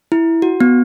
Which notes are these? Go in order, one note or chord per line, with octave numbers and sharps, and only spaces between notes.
E4
F#4
B3